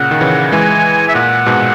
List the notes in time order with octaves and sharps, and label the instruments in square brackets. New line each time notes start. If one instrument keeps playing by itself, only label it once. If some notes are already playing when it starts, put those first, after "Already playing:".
Already playing: [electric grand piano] A#2 C#3 [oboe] F#5
[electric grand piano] D#3
C#3 E3
[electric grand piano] E3 G#3 [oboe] G#5
[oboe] E5
[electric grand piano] A#2 [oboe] F#5
[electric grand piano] G#2 B2